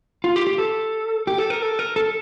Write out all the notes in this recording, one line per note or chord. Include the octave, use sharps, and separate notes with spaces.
F4
G4
G4
A4
G4
A4
A#4
A4
A#4
A4